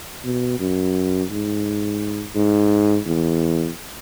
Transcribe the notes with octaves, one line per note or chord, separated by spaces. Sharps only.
B2
F#2
G#2
G#2
E2